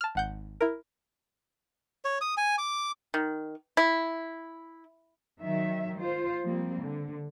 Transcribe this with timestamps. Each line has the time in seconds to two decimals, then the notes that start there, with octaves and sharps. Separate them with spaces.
0.01 A5 F6
0.15 G#1 F#5 G6
0.61 E4 A#4
2.05 C#5
2.21 D#6
2.37 G#5
2.58 D6
3.14 D#3
3.77 E4
5.41 D#3 F#3 E5
5.99 F4 C5
6.43 F3 G3 A#3 C4
6.82 D3